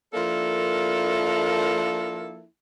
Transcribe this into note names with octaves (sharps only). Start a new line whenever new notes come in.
F3 A#3 D4 E4 A4 A#4